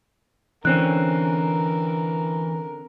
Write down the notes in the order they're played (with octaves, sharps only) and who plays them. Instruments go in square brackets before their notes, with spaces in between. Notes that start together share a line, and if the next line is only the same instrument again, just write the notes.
[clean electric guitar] D3 C4 C#4 [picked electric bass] E3 [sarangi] A#4 [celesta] F#6